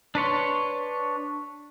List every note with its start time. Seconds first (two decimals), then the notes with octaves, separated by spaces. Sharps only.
0.15 D4 B4 C#5 C6